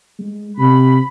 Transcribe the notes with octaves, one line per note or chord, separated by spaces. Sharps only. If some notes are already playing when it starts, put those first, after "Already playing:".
G#3
C3 B5